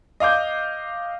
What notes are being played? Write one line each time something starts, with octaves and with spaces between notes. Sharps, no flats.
D#5 F5 D6 G6